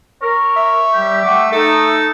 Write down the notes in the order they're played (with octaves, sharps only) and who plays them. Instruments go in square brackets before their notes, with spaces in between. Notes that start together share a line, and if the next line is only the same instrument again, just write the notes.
[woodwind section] A#4 [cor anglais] C#5
[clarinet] E5
[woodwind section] G3 G4
[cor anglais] A3 [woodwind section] F#5 G5 D6
[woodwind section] D#4 [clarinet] A4